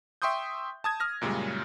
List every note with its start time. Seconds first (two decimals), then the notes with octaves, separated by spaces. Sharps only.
0.22 E5 G5 C6 C#6 D#6 G6
0.84 A5 D#6 G#6
1.00 D#6 F6 A#6
1.22 F#2 A#2 C#3 G3 G#3